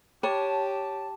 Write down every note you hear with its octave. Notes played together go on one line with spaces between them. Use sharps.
G4 C#5 G5 A5 D6 E7